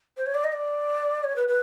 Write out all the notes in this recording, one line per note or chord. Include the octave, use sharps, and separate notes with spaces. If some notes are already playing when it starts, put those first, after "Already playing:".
C5
C#5
D5
D#5
D5
C#5
B4
B4